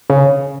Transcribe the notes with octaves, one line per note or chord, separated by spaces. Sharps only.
C#3